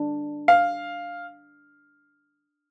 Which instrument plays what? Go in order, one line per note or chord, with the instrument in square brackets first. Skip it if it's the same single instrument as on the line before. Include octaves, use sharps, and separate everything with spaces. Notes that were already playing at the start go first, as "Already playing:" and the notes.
Already playing: [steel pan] D4
[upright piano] F5